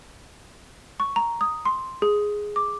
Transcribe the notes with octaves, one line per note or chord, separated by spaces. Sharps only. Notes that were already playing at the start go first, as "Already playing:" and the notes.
C#6
A#5
D#6
C6
G#4
D6